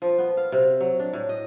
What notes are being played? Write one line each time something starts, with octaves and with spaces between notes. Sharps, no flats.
F3
B3
F5
C3
F#3
D4
A2
D#5